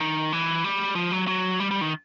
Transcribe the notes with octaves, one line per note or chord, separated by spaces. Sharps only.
D#3
E3
G3
F3
F#3
F#3
G3
G3
D#3